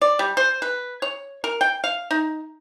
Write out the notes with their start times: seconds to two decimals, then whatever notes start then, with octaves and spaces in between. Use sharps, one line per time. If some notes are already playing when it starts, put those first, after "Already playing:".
0.02 D5
0.19 G3
0.37 C5
0.62 B4
1.02 C#5
1.44 A#4
1.61 G5
1.84 F5
2.11 D#4